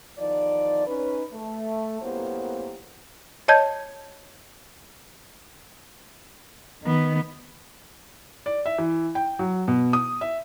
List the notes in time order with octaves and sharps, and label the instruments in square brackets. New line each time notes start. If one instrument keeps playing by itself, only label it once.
[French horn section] E2 D#3 F3 D#4 D5
C#4 D#4 B4
A3
F#2 A2 A#3 B3 G4 C5
[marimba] C#5 D#5 A5 G6 G#6
[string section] D#3 [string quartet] B3
[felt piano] D5
E5
E3
G5
F#3
B2
D#6
E5